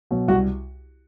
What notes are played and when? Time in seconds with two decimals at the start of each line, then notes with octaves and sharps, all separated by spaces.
0.11 B2 F#3
0.28 C2 F#4